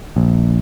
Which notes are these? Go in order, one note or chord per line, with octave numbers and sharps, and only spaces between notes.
A#1